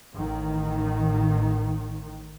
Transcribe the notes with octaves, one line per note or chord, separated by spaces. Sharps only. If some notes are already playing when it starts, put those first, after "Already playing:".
A1 D#3